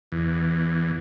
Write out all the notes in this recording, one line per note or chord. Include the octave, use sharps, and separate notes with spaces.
E2